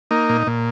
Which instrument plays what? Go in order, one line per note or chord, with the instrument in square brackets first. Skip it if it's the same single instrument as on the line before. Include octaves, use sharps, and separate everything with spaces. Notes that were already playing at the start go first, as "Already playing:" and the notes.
[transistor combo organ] A#3 D#4
A#2
A#2